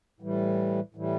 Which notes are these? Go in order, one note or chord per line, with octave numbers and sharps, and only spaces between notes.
A2 E3 G3
A2 E3 G3